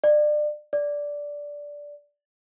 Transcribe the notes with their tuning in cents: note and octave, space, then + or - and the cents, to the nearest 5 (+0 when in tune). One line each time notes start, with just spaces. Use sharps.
D5 +30
D5 -10